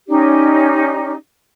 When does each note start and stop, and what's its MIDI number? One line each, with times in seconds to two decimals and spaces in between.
0.08 1.13 61
0.08 1.13 63
0.08 1.13 67
0.08 1.13 74